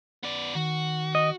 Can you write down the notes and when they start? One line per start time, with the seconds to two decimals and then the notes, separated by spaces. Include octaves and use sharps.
0.23 B3 D5
0.55 D#3 F#4
1.15 D#5